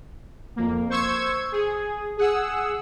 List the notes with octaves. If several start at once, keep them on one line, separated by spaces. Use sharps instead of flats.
F2 A#3
C5 C#6 E6 G#6
G#4
G#4 F#5 E6